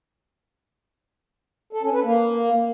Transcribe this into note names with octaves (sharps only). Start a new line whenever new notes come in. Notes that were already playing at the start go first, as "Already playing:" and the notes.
A4
C#4
B4
A#3